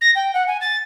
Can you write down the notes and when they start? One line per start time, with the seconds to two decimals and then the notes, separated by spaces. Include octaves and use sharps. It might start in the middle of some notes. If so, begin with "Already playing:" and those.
0.01 A#6
0.15 G5
0.34 F#5
0.48 G#5
0.61 A6